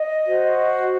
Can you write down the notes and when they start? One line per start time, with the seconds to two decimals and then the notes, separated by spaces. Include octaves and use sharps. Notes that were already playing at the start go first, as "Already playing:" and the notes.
Already playing: D#5
0.26 F#4 C5